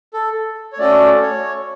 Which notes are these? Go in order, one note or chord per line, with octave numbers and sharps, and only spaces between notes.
A4
C#5
A3 C#4 F#4 A4 D5
C#5